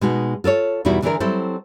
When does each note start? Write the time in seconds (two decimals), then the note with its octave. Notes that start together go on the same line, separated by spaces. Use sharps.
0.01 B2 G#3 D#4 F#4
0.44 F4 A4 A#4 C#5
0.85 E2 B2 G3 D#4 E4 F#4
1.02 D3 E3 B3 D4 G#4 A#4
1.20 F#3 G3 C4 E4 A4 C5